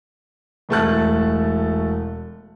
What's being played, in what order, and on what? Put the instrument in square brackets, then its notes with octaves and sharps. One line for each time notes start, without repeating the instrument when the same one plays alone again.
[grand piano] E1 A3 A5 F#6